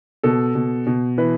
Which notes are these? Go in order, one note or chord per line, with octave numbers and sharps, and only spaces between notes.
B2 A4
B2
B2
E3 B4